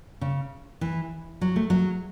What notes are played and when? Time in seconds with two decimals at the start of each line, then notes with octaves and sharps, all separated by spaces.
0.21 C#3
0.81 E3
1.41 F#3
1.56 A3
1.70 F#3